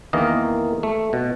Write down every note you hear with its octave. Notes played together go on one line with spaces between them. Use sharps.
E2 D#3 E3 A#3 A#4 D#5
A3
B2